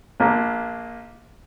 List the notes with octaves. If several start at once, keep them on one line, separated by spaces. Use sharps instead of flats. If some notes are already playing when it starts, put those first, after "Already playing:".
A#1 A#3